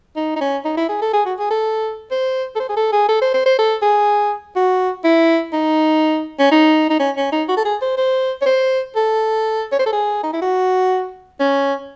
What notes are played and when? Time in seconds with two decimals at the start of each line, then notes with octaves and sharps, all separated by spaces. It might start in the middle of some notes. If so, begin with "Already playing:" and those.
0.16 D#4
0.36 D#4
0.41 C#4
0.65 D#4
0.77 E4
0.89 G#4
1.02 A4
1.13 G#4
1.25 F#4
1.39 G#4
1.50 A4
2.11 C5
2.56 A4
2.60 C5
2.69 G#4
2.77 A4
2.92 G#4
3.09 A4
3.22 C5
3.34 C5
3.46 C5
3.59 A4
3.82 G#4
4.56 F#4
5.04 E4
5.53 D#4
6.39 C#4
6.51 D#4
6.90 D#4
6.99 C#4
7.16 C#4
7.32 D#4
7.49 F#4
7.57 A4
7.65 G#4
7.82 C5
7.98 C5
8.42 C#5
8.46 C5
8.96 A4
9.72 C#5
9.79 C5
9.86 A4
9.93 G#4
10.23 D#4
10.33 E4
10.42 F#4
11.40 C#4